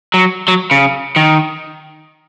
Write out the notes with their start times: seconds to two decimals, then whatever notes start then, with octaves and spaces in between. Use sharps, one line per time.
0.14 F#3
0.48 F#3
0.71 C#3
1.16 D#3